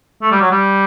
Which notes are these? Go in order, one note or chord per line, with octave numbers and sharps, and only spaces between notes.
A3
G3
F#3
G3